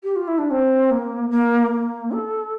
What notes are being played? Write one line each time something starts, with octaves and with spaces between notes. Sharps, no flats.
G4
F4
E4
D4
C4
A#3
A#3
A#3
A4